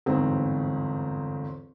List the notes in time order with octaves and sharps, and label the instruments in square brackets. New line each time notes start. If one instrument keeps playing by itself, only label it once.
[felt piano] G1 E2 G#2 C4